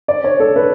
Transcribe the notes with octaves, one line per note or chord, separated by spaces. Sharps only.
D5
C#5
A4
B4